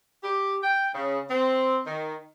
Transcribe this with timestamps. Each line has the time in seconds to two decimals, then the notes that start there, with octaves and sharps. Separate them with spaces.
0.24 G4
0.63 G5
0.94 C#3
1.30 C4
1.86 D#3